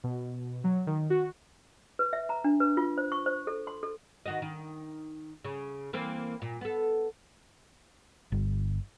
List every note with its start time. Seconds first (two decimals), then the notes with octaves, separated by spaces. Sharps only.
0.04 B2
0.64 F#3
0.87 D#3
1.10 F#4
1.99 B4
2.13 E5
2.29 A#5
2.44 D4
2.60 B4
2.77 F4
2.98 C5
3.12 C#6
3.26 C5
3.47 A4
3.67 C6
3.83 A4
4.26 D#3 F#4 D#5
4.42 D#3
5.44 C#3
5.93 E3 A#3 C4
6.42 A#2
6.61 B3 A4
8.32 G1